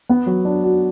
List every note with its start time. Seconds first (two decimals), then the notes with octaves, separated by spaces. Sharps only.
0.09 B3
0.26 F#3
0.45 D4
0.64 F#4